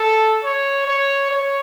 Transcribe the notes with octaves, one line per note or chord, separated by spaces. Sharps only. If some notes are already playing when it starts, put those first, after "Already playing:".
Already playing: A4
C#5
C#5
C#5